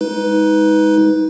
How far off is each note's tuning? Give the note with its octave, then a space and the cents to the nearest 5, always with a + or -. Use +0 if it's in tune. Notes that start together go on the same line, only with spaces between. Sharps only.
G#3 -15 D#4 +25 B4 +0